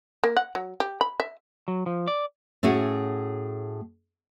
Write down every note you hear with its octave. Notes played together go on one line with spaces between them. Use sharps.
A#3
F#5
F#3
G4
B5
E5
F#3
F3
D5
A2 A3 C#4 F#4 G#4 F#5